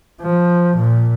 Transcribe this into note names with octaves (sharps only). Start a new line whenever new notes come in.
F3
A#2